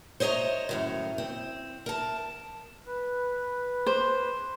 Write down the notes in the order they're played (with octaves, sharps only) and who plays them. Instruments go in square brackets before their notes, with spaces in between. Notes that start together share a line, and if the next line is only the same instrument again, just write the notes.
[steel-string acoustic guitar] C5 C#5 D#5 E5 A#5
F#2 A2 D#3
C4
A#4 A5
[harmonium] B4
[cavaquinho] C5